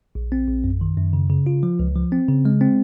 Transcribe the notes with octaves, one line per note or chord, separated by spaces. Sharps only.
A#1
C4
A#1
F#2
D#3
F#2
C#3
C#3
F4
F3
C#2
F3
C4
C#3
G#3
C4